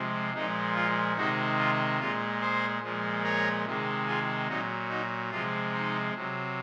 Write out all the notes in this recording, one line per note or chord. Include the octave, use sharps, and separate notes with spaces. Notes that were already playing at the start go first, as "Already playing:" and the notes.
Already playing: C3 F3 G#3
A#2 F3 G#3 D#4
F4
C3 D#3 G#3 D#4 F#4
F4
A#2 G#3 F4
G#4 C5
A#2 F3 G#3
A#4 C#5
C3 D#3 G#3
F4 G#4
A#2 F#3 D#4 F#4
D#4 F#4
C3 F3 G#3 F4
D#4
C3 F#3